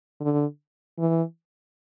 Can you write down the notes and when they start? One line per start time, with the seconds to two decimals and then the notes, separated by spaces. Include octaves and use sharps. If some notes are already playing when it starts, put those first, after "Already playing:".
0.21 D3
0.98 E3